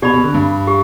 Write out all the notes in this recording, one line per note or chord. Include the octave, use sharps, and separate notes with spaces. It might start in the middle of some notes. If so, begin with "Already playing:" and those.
B2 G4 D5 B5
B2
D3
G2
G4